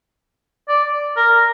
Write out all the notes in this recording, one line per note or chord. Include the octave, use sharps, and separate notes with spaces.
D5
A#4